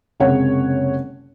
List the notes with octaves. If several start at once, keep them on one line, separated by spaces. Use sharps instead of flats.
F#1 C3 G#3 C#5 F#5